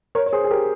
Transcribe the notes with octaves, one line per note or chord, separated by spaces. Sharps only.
A#4 C#5
C#5
G#4 C5
G#4
G4 A#4